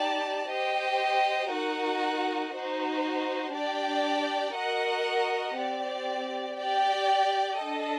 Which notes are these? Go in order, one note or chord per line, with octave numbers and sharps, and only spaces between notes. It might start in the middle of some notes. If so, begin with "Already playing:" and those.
Already playing: D#4 G4 D5 A5
G4 C5 D#5 G5
D#4 F#4 A#4 F#5
D#4 F#4 C5
D4 G4 D5 G5
F#4 A#4 D#5 F#5
C4 G4 D5
G4 D5 G5
D4 A4 D#5